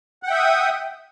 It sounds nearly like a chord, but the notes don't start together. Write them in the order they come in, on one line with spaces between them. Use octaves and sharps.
F#5 G5 E5 D#6